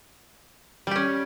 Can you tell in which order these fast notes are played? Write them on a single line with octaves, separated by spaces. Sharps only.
G3 G4 C#4